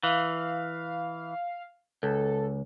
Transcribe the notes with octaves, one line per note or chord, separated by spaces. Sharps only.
E3 F5
C#2 A4